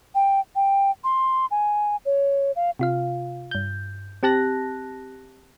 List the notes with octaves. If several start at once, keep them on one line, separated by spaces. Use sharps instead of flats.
G5
G5
C6
G#5
C#5
F5
C3 F4 F5
G2 G6
C4 G4 A5 F#6 A#6